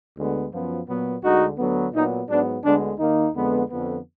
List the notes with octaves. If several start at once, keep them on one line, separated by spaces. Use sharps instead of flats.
D2 D3 G#3 B3
F#2 F3 B3
A#2 F#3 B3
D2 D3 G#3 D#4 F#4
D2 D3 F#3 B3
A#2 F#3 B3 D#4
G#2 F#3 B3 D4
D2 D3 G#3 B3 D4
D#2 D#3 A#3 D#4
F2 D3 G#3 B3
F2 D3 F3 B3